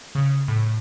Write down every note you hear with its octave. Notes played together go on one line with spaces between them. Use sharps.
C#3
A2